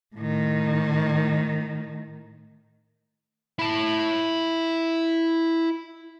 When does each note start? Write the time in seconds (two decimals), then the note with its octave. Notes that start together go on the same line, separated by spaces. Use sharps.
0.16 A2 D#3
3.59 E4 A5